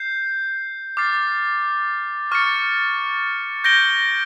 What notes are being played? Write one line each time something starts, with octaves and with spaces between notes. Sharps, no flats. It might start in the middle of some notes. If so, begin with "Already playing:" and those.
Already playing: G6 C7
D6 F6 A6 C7
C#6 F6 A6 C#7
G6 A#6 D7 G7